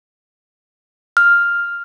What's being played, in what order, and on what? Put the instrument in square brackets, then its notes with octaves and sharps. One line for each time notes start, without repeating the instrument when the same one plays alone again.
[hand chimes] F6